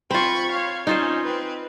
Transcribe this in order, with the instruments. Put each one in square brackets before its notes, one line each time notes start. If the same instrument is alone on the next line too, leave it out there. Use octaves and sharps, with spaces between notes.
[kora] C4 F4 [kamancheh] B5 C#6
[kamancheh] C#5 F5
[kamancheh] C#4 [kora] D#4 F4 C5
[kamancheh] C4 B4